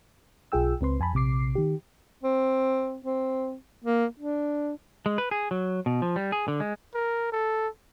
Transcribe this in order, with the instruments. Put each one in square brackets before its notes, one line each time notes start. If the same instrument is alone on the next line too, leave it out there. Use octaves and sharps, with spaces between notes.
[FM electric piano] B1 F4 G#4 G5 E6
C#2 C4 B4 C6
F2 G#5 A5 B5
A#1 C3 D6 C7
D#3 G4
[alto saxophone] C4
C4
A#3
D4
[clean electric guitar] G#3
B4
G#4
F#3
B2
F3
G3
G#4
D3
G#3
[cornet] A#4
A4